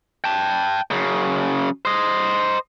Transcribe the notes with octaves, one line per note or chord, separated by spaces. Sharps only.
G5 A5
F#2 C#3
C5 D#5